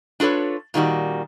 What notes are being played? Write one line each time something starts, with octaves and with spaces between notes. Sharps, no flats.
D4 F4 A4 B4 C#5
A#2 D#3 G3 F#4